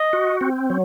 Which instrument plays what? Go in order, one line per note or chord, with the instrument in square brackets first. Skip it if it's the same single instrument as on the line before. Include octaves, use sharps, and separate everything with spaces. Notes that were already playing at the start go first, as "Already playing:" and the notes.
Already playing: [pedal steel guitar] D#5
[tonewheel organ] F#4
C4
F#3